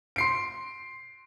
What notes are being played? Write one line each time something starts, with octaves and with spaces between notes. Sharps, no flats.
C6 C7 D7